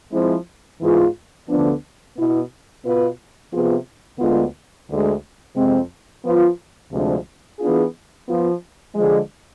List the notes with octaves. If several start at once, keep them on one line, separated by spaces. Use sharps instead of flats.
F3 G#3 C4 E4
G#2 E3 B3 F4 G#4
D2 D3 F3 B3 D4
B2 B3 E4
B2 B3 F4 B4
C3 F3 B3 F4 G#4
D2 D3 G#3 B3 F4
D2 D3 G#3
F2 C3 G#3 C4
F3 B3 F4 B4
D2 C3 F3 G#3 D4
E3 B3 D4 F4 G#4
F3 B3 F4
D3 F3 G#3